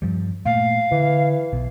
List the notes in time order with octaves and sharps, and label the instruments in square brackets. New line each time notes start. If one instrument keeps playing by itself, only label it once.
[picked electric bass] G2 F3 G3
[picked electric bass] A#2 A3 A#3 [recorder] F5
[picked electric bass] D3 [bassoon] E3
[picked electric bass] B1 B2